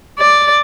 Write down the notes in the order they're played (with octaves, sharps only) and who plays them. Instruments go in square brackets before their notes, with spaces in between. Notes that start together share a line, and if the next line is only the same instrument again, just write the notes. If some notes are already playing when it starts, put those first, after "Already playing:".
[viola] D5